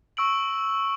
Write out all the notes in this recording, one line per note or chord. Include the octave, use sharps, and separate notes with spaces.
C#6 E6 D7 F#7